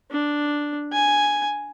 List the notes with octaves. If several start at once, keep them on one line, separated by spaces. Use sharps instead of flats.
D4
G#5